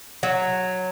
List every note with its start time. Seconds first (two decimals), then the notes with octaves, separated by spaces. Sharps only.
0.23 F#3